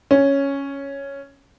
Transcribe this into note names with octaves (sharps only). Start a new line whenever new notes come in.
C#4